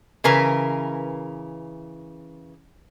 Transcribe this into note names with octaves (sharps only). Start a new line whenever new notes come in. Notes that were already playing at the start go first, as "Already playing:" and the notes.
C#3 E3 A#4 B4